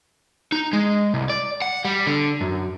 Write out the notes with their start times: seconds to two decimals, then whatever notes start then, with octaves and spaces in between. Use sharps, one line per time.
0.52 D#4
0.73 G#3
1.14 C2
1.29 D5
1.62 F#5
1.85 G3
2.07 D3
2.41 F#2